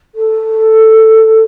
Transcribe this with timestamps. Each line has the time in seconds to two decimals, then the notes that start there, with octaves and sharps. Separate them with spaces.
0.15 A4